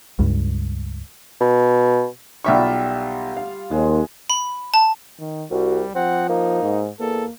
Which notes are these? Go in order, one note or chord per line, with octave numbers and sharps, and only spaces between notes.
C#2 G2
B2
B1 G3 F4 E5 C#6
F5
D#2 G#3
B5
A5
D#3
C2 G3 F#4
F3 C4 F#5
A#3 D#4
G#2
E2 A#3 A4